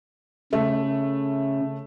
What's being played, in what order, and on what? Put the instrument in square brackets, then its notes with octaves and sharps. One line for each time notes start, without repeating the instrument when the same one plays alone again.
[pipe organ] C#3 [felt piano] A3